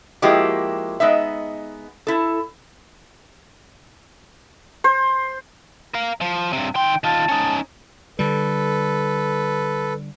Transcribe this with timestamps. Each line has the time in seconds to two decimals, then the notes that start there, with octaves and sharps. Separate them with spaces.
0.22 F3 G#3 A#3 E4 F#4 G4
1.00 G#3 B3 D#4 E5
2.07 E4 A4
4.84 C5
5.94 A#4 F5
6.21 F3
6.53 G2 C3
6.75 D#3 G5 C6
7.04 D#3 F4 A5
7.29 C#4 D#4
8.19 D3 G3 A4 B4